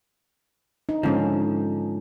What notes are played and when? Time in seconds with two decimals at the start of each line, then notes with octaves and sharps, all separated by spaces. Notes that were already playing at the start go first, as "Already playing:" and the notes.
0.89 D#4
1.03 G#2 D3 F3 C#4 D#4